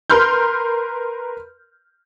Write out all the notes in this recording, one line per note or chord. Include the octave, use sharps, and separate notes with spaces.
A#4 B4 C6 F6 G6